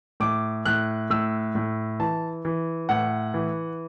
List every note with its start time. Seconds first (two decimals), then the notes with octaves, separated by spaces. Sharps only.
0.20 A2 D6
0.65 A2 F#6
1.10 A2 E6
1.55 A2
2.00 E3 A5
2.45 E3
2.89 A2 F#5
3.34 E3